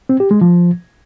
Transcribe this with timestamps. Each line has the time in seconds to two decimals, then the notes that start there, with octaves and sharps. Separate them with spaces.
0.09 C4
0.20 G4
0.31 G#3
0.41 F3